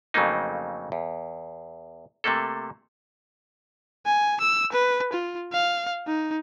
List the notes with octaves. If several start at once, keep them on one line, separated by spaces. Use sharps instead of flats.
F2 C#3 F#3 A3 A#3 D#4
E2
C3 A3 A#3 A4
G#5
E6
B4
F4
F5
D#4